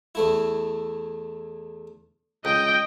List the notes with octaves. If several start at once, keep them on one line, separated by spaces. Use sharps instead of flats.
E2 A3 E4
C#2 D#5 G5